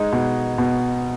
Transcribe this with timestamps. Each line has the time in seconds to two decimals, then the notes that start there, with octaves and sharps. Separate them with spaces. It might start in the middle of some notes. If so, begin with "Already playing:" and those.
Already playing: G#3 D#4
0.12 B2
0.58 B2